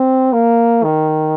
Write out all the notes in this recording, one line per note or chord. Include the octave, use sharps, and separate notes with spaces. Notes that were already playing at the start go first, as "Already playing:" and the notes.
Already playing: C4
A#3
D#3